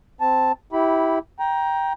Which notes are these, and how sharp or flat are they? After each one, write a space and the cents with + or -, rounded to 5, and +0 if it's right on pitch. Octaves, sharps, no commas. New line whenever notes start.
C4 -10 A5 +0
E4 -20 G4 -15 B5 +0
G5 +0 A#5 +20